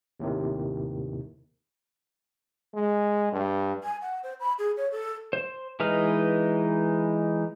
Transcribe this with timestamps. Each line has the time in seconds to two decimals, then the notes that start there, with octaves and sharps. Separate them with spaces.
0.20 D#2 A2 C3 D#3
2.75 G#3
3.32 G2
3.84 G#5
4.02 F#5
4.23 C5
4.40 B5
4.59 G#4
4.77 C#5
4.92 A4
5.33 C5
5.80 E3 G#3 D#4 B4 F6